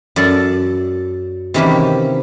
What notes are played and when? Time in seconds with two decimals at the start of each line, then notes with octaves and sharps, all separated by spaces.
0.16 F#2 A4 D5 A5
1.54 C3 D#3 E3 A#3 C#4 G4